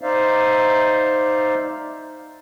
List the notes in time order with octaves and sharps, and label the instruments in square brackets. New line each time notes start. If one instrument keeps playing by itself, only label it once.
[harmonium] D#4 C5 D5 E5 F5